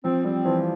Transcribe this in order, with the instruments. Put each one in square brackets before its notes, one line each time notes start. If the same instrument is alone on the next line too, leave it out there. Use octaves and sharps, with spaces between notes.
[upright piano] F3 [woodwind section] C4
[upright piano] G3 [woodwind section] C4
[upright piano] E3 [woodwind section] F3